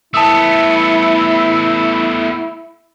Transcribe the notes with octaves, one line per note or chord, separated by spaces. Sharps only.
A3 B3 E4 A5 D#6 E6